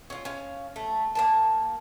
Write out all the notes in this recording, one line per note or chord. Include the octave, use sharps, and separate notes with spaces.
C#4 F4
C#4 F5
A3
A#3 A#4 A5